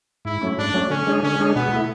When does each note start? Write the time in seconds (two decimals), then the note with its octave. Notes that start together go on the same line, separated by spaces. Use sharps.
0.25 G#2 E4
0.41 F#3 A3 C#4
0.58 G#2 D4
0.74 F#3 A3 C#4
0.90 D3 C#4
1.07 G#3 D4 G#4
1.23 D3 C#4
1.40 G#3 D4 G#4
1.55 B2 B3
1.72 A3 E4